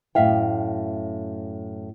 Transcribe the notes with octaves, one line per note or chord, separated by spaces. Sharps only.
F#2 A2 E5 F5 G5